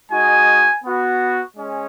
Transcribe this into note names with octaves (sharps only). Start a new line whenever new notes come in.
G#3 D#4 F#4 G#5
B3 F#4
G#3 C#4